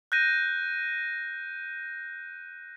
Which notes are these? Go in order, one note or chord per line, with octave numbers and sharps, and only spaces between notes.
F#6 G6 A#6 D#7